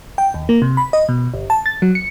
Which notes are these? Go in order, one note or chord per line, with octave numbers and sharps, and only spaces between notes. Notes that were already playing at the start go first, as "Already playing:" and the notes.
G5
D#2
A#3
C3
B5
D#5
B2
G1
A5
A6
F#3
C#7